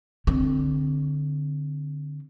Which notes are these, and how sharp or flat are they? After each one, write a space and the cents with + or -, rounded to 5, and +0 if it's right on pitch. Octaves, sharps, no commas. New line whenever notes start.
D3 +0 C4 +0